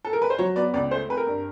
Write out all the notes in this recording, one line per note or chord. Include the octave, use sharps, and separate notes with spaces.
A4
A#4
B4
C5
F#3 C#5
B3 D5
C#2 D5
A3 C5
C4 B4
A#4
G2